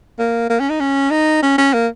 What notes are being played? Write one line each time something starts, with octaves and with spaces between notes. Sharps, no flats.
A#3
A#3
C#4
D#4
C#4
D#4
C#4
C#4
A#3